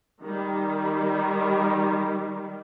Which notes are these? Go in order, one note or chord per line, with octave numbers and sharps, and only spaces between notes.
D#3 G3